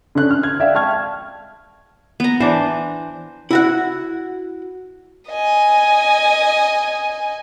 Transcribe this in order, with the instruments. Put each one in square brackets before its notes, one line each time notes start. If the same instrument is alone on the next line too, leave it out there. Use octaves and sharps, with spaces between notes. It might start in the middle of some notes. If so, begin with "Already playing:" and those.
[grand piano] D3 C#4 F#6
F6
G#6
D5 E5 F5 G5
G5 A5 C#6 F6 G#6
[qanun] B3 A#5
[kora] E3 D4 [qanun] C5
[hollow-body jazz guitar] E4 F#4 F#5
[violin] D#5 G#5